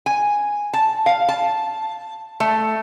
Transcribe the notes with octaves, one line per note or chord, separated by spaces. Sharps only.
G#5
A5
F5
A5
A3